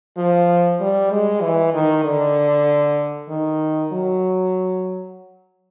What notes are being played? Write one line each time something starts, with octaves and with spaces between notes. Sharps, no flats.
F3
G3
G#3
E3
D#3
D3
D#3
F#3